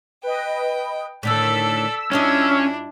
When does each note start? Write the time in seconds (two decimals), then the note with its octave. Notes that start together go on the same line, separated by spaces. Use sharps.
0.23 B4 D#5 G5
1.23 A2 D3 D#3 A4 D5 E6 B6
2.12 G2 C#4 D4 E4 F4 D#5